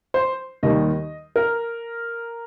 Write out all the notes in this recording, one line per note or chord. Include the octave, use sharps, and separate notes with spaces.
C5
D#2 D#3 G3 D#5
A#4